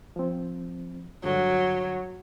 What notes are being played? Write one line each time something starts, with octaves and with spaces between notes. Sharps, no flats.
F3 C4
G2 D3 F#3